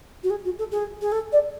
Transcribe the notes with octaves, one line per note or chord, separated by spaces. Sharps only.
F#4
G#4
F#4
A4
G#4
G#4
A4
D5